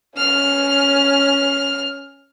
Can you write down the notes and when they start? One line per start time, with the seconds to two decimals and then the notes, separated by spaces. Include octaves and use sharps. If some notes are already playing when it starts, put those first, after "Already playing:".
0.17 C#4 F6